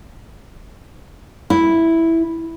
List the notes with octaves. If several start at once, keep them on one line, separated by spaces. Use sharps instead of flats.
E4